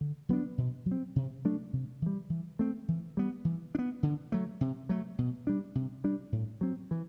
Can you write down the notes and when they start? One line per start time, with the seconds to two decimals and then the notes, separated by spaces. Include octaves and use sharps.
0.01 D3
0.29 F#3 B3 D4
0.58 B2
0.86 F#3
0.91 C4
1.16 C3
1.45 F#3 A3 D4
1.73 C3
2.02 E3 G3
2.30 E3
2.59 A3 C4
2.88 E3
3.17 G3 B3
3.45 E3
3.75 D4
3.79 B3
4.03 D3
4.32 F#3 A3
4.61 C3
4.89 F#3 A3
5.18 B2
5.47 G3 D4
5.75 C3
6.04 G3 D4
6.32 A2
6.61 F#3 C4
6.91 E3